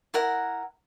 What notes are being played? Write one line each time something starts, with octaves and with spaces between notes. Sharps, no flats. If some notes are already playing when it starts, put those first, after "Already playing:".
E4 A#4 F#5